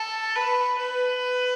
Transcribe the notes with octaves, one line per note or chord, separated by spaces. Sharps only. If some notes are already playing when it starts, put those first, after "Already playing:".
Already playing: A4
B4
B4